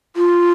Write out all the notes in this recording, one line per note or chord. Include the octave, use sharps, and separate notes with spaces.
F4